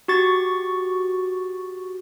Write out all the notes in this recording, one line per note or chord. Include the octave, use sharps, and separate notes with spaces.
F#4 G4 C#6 A6